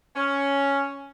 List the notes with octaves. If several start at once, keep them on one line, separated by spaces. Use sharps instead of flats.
C#4